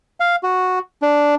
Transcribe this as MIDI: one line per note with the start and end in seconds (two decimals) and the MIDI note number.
0.20 0.36 77
0.43 0.79 66
1.02 1.35 62